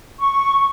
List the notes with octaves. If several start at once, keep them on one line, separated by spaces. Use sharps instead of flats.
C#6